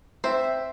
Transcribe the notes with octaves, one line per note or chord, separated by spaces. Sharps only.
C4 C5 E5